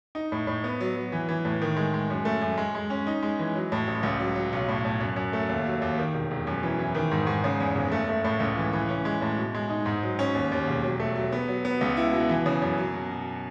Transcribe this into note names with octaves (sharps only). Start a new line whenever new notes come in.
D#4
A2
A2
B3
F#3
F#3
E3
E3
A2
D#3
G#3
G#3
F#2
A3
F#2
G#3
G#3
C#4
D#4
G#3
E3
F#3
A2
A1
C#2
F#3
F#3
B1
A2
A2
F#2
F#2
A3
D#2
F#3
D#2
D#3
E1
E1
F#2
E3
E3
D#3
G#2
G#2
C#3
E2
F#1
A3
A3
A2
C#2
E3
E3
C#4
G#3
A2
B2
G#3
D#4
G#2
F#3
C#4
D#2
D#2
E1
F#3
A3
F#3
B3
F#3
B3
C#2
E4
B2
E3
C#3
F#2
F#3
B2
B2